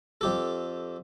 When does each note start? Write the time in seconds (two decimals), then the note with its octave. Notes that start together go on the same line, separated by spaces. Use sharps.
0.21 F2 G4 A4